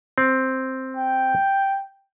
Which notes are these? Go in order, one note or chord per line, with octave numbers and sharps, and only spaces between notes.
C4
G5